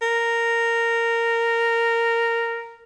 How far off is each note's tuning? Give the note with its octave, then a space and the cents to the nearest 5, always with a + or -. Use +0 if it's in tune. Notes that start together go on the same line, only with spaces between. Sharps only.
A#4 -10